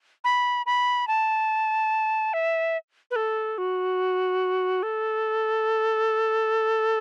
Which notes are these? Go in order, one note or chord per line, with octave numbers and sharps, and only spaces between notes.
B5
B5
A5
E5
B4
A4
F#4
A4